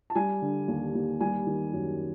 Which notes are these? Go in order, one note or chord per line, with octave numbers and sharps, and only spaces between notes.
A5
G3 G#5
D3
D#2
D#2
G3 G#5
D#3
F#2